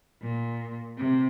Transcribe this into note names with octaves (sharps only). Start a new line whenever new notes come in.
A#2
C3